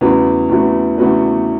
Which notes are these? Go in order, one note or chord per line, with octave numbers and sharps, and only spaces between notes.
E2 C#3 A3 F#4 B4
E2 C#3 A3 F#4 B4
E2 C#3 A3 F#4 B4